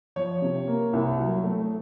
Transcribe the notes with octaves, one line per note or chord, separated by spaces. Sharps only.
F3 C#5
C3
A#3
C2
F#3
A3